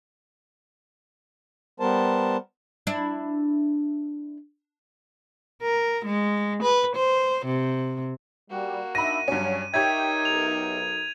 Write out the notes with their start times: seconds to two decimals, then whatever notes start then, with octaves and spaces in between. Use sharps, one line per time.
1.80 G3 B3 A#4 C5 A5
2.87 D4 E4
5.62 A#4
6.05 G#3
6.63 B4
6.96 C5
7.45 C3
8.50 G3 A#3 F#4
8.95 D4 D#4 E5 B5 A#6 D#7
9.28 G2 F#3 C#4
9.74 D#4 G4 A#4 C#5 E5 G5 G#6 D#7
10.25 B1 F7